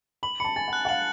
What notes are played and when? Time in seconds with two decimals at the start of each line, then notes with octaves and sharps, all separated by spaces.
0.23 B5 F#7
0.40 A5 B5 C#7
0.56 G#5 A6
0.68 F#5
0.73 F#6
0.85 F#5
0.89 F5 F#7